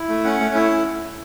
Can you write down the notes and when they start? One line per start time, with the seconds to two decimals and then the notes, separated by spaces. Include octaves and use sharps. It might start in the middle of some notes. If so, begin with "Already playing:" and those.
Already playing: E4
0.09 A3
0.24 C#4 F#5
0.40 A3
0.55 E4